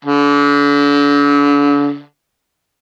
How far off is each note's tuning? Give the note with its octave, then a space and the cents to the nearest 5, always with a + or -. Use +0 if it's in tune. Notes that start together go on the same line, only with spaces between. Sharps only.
D3 -40